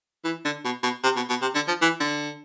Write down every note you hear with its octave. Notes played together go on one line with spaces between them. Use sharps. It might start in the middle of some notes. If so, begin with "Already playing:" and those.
E3
D3
B2
B2
C3
B2
B2
C3
D3
F3
E3
D3